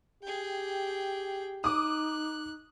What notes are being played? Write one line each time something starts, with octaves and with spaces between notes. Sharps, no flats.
G4 G#4 G5
D#4 D6 D#6 F#6